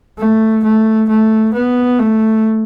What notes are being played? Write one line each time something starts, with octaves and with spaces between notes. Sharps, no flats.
A3
A3
A3
B3
A3